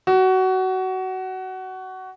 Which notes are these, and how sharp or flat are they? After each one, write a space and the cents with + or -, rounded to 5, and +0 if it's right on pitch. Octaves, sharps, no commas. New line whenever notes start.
F#4 +20